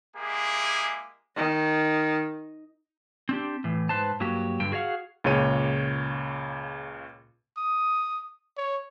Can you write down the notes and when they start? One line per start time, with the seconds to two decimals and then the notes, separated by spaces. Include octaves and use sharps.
0.16 G#3 A#3 E4 G4 G#4
1.37 D#3
3.29 C4 D4 G4
3.64 A2 E3
3.89 G#2 B4 C5 A5
4.20 G2 F#3 A#3 F#4 G4
4.60 G2 D3 G5
4.72 F#4 G#4 D5 F5 F#5
5.24 C#2 A#2 C#3 C#5 D#7
7.58 D#6
8.57 C#5